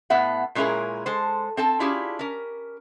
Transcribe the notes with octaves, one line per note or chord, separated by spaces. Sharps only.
A2 B3 E5 F#5
A#2 G#3 C#4 E4 G#4 A#4
G#3 A4 C5
C4 A4 A5
C#4 D4 E4 F4 G4 G#4
C#4 A#4